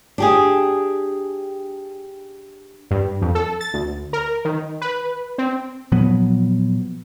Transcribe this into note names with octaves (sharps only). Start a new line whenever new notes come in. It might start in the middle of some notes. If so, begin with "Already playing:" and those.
D4 G4 G#4
G2
F2
A4
A6
D2
A#4
D#3
B4
C4
A#2 F3 F#3 B3